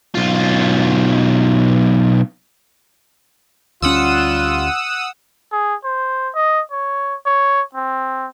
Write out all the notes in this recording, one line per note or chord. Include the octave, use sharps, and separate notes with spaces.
B1 F4
D2 G3 C#4 F4 F#5 D#6 E6
G#4
C5
D#5
C#5
C#5
C4